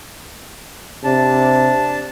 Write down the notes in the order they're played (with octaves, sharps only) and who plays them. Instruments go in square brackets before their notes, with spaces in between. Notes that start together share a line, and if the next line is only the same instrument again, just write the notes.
[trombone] C3 [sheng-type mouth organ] D4 A5